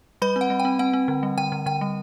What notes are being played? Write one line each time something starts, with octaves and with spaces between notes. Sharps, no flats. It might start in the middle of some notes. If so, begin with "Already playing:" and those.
G3 B4 B5
C4
F#5
G3
G5
C4
C4 F#5
C4
D3
G3
D3 G5
D3
D3 G5
G3